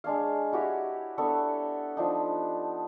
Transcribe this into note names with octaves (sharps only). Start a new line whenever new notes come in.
G#3 D4 C#5 F5
E4 F#4 G4 C#5
B3 D4 A4 C#5
F3 D4 D#4